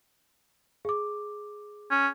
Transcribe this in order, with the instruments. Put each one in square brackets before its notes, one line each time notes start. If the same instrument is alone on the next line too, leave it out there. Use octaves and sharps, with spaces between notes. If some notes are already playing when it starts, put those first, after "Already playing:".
[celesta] G#4 D6
[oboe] C#4